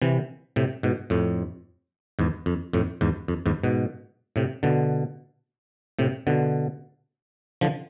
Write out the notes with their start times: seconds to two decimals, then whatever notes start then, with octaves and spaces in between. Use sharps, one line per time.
0.02 C3 E3
0.56 A2 C3
0.83 G#2 B2
1.10 F2 A2
2.19 E2 G#2
2.46 F2
2.73 F2 A2
3.01 E2 G#2
3.28 F2
3.46 E2 G#2
3.64 G#2 B2
4.36 A2 C3
4.63 B2 D3
5.99 A2 C3
6.27 B2 D3
7.61 D3 F3